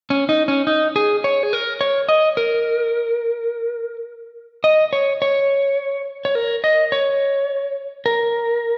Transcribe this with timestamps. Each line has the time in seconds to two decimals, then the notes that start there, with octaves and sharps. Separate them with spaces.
0.10 C#4
0.29 D#4
0.48 C#4
0.67 D#4
0.96 G#4
1.24 C#5
1.43 G#4
1.53 A#4
1.81 C#5
2.09 D#5
2.37 A#4
4.64 D#5
4.93 C#5
5.22 C#5
6.25 C#5
6.35 A#4
6.64 D#5
6.92 C#5
8.06 A#4